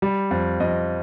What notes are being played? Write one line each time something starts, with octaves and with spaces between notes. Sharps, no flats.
G3
F2
F2 D#5